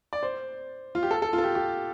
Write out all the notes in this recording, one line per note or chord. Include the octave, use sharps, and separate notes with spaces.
D5
C5
F4
G4
A4
A4
F4
A4
G4
G4